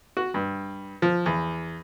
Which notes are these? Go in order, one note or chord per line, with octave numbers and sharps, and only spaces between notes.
F#4
G2
F3
E2